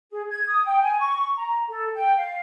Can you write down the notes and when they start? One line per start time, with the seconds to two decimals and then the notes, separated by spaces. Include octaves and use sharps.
0.11 G#4
0.29 G#6
0.46 D#6
0.65 G5
0.82 G#5
0.99 C#6
1.37 A#5
1.68 A4
1.93 G5
2.16 F5